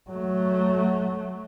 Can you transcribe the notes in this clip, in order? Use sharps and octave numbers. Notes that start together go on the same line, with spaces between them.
F#3 A3